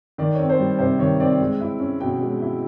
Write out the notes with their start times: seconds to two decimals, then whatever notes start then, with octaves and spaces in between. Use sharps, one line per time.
0.18 D#3 D5
0.34 C4 C#5
0.49 C5
0.59 G3
0.79 C3 C5
0.99 D#3 C#5
1.20 C4 D5
1.40 G#3
1.61 E4
1.80 C#4
2.00 B2 G5
2.21 G#3
2.41 E4